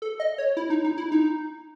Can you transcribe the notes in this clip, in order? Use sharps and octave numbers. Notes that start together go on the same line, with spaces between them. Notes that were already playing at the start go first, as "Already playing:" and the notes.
A4
D#5
C#5
E4
D#4
D#4
E4
D#4